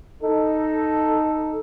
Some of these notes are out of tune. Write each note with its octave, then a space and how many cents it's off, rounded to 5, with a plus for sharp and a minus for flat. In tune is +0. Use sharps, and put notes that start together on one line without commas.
D#4 +0 A4 +0